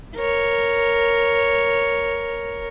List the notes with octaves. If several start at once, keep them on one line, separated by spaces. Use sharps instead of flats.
A#4 C#5